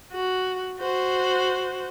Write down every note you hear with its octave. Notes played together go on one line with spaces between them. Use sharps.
F#4
F#4 C5